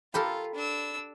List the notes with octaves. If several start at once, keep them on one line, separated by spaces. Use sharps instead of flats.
F4 G4 A4 A#4 B5
D4 E6